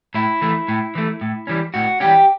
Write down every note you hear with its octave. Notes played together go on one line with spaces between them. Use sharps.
A2 E4
E3 A3
A2
E3 A3
A2
E3 G3 C#4
A2 F#4
E3 G3 C#4 G4